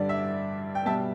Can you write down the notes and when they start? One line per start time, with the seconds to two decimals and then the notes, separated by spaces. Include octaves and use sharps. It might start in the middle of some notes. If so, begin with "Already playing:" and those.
Already playing: G2 D3 G3 D5
0.09 E5
0.75 G5
0.85 B2 G3 E5 A5